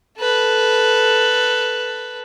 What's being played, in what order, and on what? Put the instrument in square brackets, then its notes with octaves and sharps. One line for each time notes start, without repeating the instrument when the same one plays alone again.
[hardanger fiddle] A4 B4